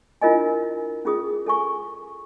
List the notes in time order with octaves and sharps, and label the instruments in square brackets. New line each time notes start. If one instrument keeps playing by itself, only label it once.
[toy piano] D4 E4 F4 A#4 D#5 G#5
C#4 F4 G#4 D#6
A4 G#5 C#6